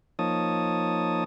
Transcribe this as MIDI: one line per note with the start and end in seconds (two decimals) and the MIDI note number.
0.19 1.24 53
0.19 1.24 58
0.19 1.24 63
0.19 1.24 73
0.19 1.24 81
0.19 1.24 87